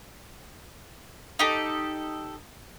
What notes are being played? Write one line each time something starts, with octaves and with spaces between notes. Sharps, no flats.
D#4 G4 A4